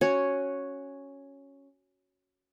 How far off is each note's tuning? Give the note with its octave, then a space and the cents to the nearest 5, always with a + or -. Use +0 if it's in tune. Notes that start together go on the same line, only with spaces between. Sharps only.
C#4 +0 F#4 +0 C#5 +0